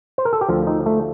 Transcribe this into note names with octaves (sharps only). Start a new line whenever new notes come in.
C5
A#4
A4
G4
D2 D3 F3 F4
D#4
A3